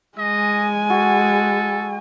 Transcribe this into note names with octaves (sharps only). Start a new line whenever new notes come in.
G#3 D#5 G#5
F#4 A4